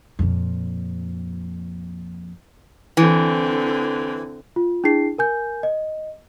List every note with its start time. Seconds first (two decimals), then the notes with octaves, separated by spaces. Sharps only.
0.19 F2 A#2
2.97 D3 E3 C4
4.56 F4
4.84 D4 E4 G#4 C7
5.18 A#4 G#5 G6
5.63 D#5